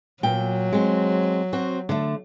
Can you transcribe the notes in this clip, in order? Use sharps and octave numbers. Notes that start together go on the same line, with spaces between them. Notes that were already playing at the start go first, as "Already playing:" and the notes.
A#2 F#3 G5
G#3 C4
C4 F#4
D3 A3